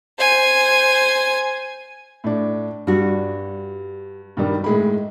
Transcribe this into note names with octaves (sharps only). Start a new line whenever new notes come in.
C5 G#5
A2 D4
G2 G3 F#4
G2 D#3 G3
A2 G#3 B5